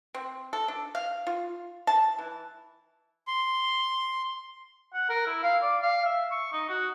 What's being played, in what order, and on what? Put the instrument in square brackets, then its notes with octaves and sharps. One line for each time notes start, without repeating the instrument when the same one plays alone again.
[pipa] C4
A4
D4
F5
F4
A5
E3
[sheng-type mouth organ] C6
[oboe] F#5
A#4
E4
F5
D5
F5
E5
C#6
D#4
F#4